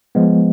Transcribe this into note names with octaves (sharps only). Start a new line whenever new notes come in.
F3 G#3 B3